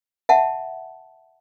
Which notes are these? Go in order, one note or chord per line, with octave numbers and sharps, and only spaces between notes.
E5 F#5 A5